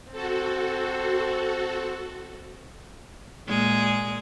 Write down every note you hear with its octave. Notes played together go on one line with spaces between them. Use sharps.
C4 F#4 A4
A#2 G#3 G#4